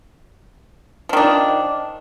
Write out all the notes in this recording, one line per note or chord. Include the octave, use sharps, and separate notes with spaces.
D#3 F3 D4